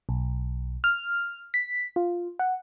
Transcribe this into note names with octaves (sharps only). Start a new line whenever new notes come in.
B1
F6
B6
F4
F#5